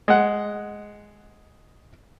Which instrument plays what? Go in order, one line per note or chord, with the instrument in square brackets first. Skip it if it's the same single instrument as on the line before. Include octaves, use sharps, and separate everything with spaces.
[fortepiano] G#3 F#5